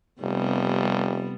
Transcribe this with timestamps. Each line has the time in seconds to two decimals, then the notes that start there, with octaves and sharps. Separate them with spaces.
0.21 F1 C3 G3 B3